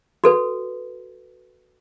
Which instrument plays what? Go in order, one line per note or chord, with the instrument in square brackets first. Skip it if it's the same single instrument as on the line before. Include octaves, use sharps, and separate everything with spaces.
[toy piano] F#4 A4 B4